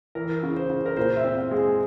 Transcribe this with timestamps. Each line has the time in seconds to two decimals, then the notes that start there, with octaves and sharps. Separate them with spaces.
0.15 E3 A#4
0.43 C#3
0.57 C5
0.70 C#3
0.86 A#4
0.97 A#2 C5
1.17 E5
1.24 C4
1.37 F5
1.51 G#3
1.58 G#5